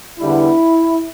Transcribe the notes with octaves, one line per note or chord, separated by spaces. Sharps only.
E2 D3 G3 B3 E4